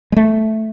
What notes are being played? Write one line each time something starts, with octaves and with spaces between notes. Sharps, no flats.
G#3
A3